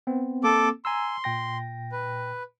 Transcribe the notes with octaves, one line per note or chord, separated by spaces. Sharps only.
B3 C4
A#3 C4 A4 D6
G#5 A#5 C6 E6
A#2 G5 A#6
B4